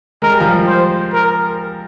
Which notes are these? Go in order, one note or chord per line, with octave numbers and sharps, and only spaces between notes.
G#3 A#4
G3
F3
G3
C5
A#4